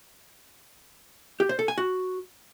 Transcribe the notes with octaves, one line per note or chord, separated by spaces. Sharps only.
G4
C5
A4
G#5
F#4